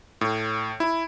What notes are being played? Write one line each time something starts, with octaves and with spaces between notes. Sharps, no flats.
A2
E4